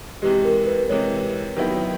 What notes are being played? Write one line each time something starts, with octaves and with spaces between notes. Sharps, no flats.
C3 E3 G#3 G4
A#4
B4
C3 E3 G#3 C#5
D#3 F#3 B3 E4 G4